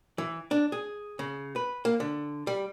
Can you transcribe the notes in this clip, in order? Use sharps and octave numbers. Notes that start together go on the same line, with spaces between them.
E3
D4
G#4
C#3
B4
A#3
D3
G3